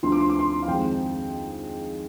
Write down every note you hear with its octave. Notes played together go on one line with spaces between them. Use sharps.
D2 D3 F3 C6
D6
C6
D6
C6
F5
F2 D#3 G#3 C4 D#4 G5